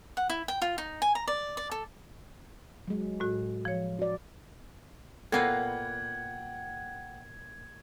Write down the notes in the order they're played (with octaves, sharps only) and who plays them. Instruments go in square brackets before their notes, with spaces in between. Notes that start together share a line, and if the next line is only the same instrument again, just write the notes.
[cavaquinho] F#5
E4
G5
F4
D#4
G#5
A#5
D5
D5
A4
[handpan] F#3 G#3
[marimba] A2 F#4
F3 C#5
[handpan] F#4 D5
[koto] A#2 A#3 B4 [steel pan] B3 A4 [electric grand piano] F#5 G5 [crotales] G#6